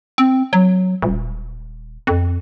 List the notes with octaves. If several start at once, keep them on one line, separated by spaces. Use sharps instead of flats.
C4
F#3
D#1
F2